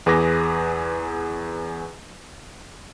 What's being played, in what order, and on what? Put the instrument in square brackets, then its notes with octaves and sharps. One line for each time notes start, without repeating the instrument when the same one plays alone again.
[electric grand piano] E2 G#4 B4 D6 A#6